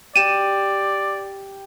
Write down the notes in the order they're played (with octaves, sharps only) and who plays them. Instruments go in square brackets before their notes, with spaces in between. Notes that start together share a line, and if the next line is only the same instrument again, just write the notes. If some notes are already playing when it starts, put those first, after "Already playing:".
[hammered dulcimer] G4 [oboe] D5 [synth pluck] D#7 E7